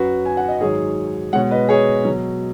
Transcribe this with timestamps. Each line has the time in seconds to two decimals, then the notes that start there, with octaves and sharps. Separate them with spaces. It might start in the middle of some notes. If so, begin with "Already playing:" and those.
Already playing: F#2 F#3 F#4 B4
0.26 G#5
0.37 F#5
0.48 D#5
0.60 G#2 D#3 F#3 G#4 C#5
1.33 B2 G#3 C#5 F#5
1.51 B4 D#5
1.69 G#4 C#5
2.05 B2 F#3